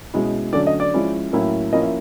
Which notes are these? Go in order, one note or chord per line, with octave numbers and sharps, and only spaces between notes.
B2 G#3 C#4 E4
D3 F#3 A3 C#4 D5
D#5
D5
F3 G#3 C#4 E4
A2 F#3 A#3 C#4 E4
F3 A#3 C#4 E4 D#5
E5